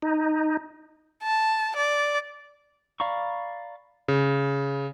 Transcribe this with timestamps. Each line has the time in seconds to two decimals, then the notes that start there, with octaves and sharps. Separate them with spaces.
0.02 D#4
1.23 A5
1.76 D5
3.00 D5 F5 A#5 B5 C#6
4.08 C#3